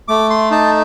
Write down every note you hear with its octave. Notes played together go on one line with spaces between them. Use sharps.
A3 D6
C6
D#4 A5